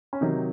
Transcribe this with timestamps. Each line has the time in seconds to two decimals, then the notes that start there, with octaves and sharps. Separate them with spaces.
0.13 C#4
0.21 C3 D#3 F#3 D#4